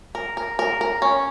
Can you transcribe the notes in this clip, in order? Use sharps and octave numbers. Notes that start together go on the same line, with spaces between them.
A#4
A#4
A#4
A#4
C#4